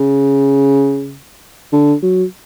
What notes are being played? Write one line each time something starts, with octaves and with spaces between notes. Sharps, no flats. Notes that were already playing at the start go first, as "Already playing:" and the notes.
Already playing: C#3
D3
F#3